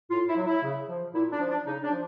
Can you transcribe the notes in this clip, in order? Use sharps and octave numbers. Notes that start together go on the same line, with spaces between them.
A2 F4
E4
F#3
E4
C#3
F3
A#2 E4
D4
F3
D4
C#3 D#4
D4
F3